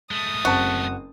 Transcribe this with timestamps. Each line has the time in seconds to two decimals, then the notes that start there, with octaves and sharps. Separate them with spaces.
0.11 G#3 A3 D#6
0.45 F#1 C4 F#4 A5